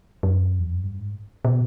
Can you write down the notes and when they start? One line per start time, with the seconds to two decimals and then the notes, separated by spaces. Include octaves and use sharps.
0.23 F#2
0.59 E2
0.68 F2
0.76 F#2
0.84 G2
0.99 G#2
1.45 B2